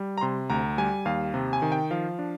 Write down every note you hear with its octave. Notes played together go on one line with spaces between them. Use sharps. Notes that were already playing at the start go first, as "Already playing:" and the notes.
Already playing: G3
A#5
C3 C6
D2 A#5
G3 G#5
D#2 F5
C3
G#5
D#3
G5
F3 F5
D4